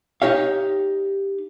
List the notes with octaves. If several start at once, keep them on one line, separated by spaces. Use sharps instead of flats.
D#4 G4 C#5 F5